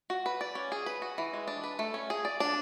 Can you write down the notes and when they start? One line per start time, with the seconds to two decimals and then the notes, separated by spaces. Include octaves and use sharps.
0.10 F#4
0.26 B4
0.41 D5
0.55 C#4
0.72 G#4
0.86 B4
1.02 F#4
1.18 E3
1.33 G#3
1.48 D4
1.64 B4
1.79 A3
1.94 C#4
2.10 G#4
2.25 D5
2.40 D4